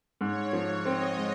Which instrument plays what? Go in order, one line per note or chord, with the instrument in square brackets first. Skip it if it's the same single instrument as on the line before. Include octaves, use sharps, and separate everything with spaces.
[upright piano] G#2 [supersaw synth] C#5
[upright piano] F3
[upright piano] C4 [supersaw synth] D#5
[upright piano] G#3